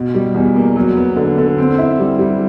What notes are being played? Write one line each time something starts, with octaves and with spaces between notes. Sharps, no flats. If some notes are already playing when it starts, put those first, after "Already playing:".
Already playing: B2
G3
E2
A#3
F#3
B3
D3
D3
C4
E4
G3
G3